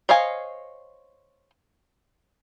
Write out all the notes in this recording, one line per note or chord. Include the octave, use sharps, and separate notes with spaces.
C5 C#5 D#5 F5 G#5